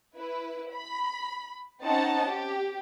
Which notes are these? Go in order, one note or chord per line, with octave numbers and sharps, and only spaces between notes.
E4 B4
B5
C4 C#4 D#4 D#5 F#5 A5
G4